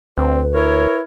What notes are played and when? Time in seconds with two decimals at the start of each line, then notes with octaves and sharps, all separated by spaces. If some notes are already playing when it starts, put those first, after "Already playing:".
0.18 D2 C4 B4
0.55 E4 A#4 C#5